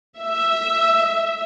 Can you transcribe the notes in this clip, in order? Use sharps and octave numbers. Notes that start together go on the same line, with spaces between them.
E5